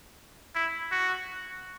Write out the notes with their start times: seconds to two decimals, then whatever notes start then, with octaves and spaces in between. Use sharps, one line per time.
0.55 E4
0.92 F#4